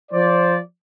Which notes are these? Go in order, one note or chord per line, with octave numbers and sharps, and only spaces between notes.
F3 C5 D5